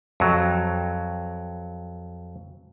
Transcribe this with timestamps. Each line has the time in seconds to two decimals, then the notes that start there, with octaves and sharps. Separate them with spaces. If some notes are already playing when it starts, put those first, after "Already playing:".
0.20 F2 F#3